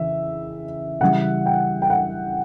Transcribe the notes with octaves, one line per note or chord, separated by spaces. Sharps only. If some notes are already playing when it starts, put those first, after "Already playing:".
Already playing: C#3 E3 E5
C#3 E3 G3 F#5
G5
G5
F#5